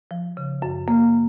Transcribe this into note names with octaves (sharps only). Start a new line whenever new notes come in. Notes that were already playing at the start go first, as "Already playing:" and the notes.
F3
C#3
F#2
A#3